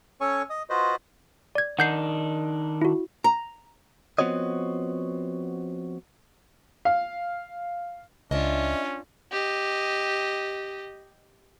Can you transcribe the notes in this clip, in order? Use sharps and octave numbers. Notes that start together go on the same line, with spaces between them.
C#4 A4 C#5 G#5 C#6
D#5 D#6
F4 F#4 B4 C5 D#5
D5 G#6
D#3 D4 D#4 F#5 G6 C7
E4 F#4
A#5
F3 B3 C4 F#4 C#5 D#5
F5
C#2 C#4 D4 F4 D#5 E5
G4 D#5